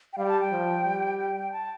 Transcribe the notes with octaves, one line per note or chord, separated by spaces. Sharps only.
G5
G3 F5
G5
A5
G5
F3
G3
G5
G5
A5